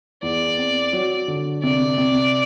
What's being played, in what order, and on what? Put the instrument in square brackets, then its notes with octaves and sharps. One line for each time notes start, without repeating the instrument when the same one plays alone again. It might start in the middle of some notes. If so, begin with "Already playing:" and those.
[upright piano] E2 [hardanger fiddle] D5
[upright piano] C4
F#3
D3
[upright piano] C3 [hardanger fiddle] D5
[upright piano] C3